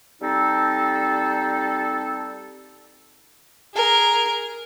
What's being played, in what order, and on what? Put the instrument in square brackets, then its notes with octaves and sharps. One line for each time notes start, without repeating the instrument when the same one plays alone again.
[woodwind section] G3 C4 D#4 A4
[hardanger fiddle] G#4 A#4